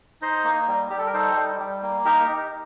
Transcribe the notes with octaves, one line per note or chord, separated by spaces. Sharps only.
D#4 C5 D#5
A#3
G3
G3 G4
A4
A#4
D#4 A4 C5
G3
G3
A#3
D#4 G4 A#4
D#4